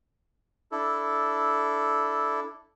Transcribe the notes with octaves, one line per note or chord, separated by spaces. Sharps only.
D4 E4 A4